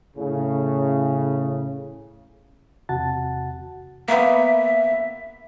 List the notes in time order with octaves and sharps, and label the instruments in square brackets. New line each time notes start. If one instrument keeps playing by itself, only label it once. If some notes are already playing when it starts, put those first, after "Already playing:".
[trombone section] A2 C#3
[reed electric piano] E2 C3 F#4 F#5 A5 A6
[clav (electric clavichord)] A#3 B3 [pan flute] E5